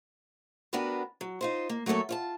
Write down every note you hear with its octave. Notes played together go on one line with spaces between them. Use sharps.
B3 D4 F#4 G4 A#4 B4
F#3
D#4 F4 C5
A#3
F#3 A3 A#3 A4 C#5
F4 C#5 A5